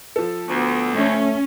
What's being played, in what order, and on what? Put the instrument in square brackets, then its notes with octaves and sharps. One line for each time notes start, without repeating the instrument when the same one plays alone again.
[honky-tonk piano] F3 A4
[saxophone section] D2 [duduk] B3
[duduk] A3 [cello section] C#4